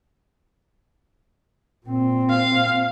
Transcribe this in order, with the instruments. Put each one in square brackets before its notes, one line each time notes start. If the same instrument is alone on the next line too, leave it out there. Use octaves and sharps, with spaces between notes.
[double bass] A#2 C4
[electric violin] F5